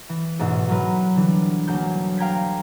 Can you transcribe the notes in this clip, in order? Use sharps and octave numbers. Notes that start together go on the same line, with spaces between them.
E3
A1 G#2 B2 E5
F#3 A#4 B4
D3 E3 G3
D2 F#3 G#3 A#3 G6
F5 G5 A#5 G6 G#6 B6